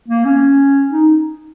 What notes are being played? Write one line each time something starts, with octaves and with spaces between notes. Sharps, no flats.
A#3
C#4
D#4